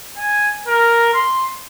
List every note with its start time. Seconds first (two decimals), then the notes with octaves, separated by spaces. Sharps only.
0.17 G#5
0.68 A#4
1.14 C6